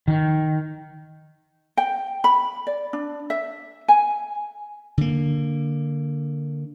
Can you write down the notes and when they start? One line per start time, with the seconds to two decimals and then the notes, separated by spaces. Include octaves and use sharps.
0.08 D#3
1.77 G5
2.24 B5
2.67 D5
2.93 D4
3.30 E5
3.88 G#5
4.98 D3 A#3